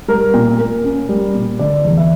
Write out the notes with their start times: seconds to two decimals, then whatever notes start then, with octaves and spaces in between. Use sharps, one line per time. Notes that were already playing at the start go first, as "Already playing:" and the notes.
0.08 G3 A#4
0.34 A#2
0.59 A#3
0.84 C#4
1.09 G3
1.34 A#2
1.59 D3 D5
1.84 E2
1.97 E5